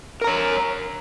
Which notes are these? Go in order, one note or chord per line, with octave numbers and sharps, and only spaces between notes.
A#4 C#5 A#5